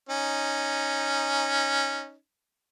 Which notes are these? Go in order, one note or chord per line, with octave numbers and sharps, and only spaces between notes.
C#4 D#4